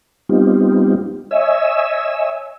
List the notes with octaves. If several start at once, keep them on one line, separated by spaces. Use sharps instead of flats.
G3 B3 C4 D#4 F4 G4
C#5 D#5 E5 G#5 E6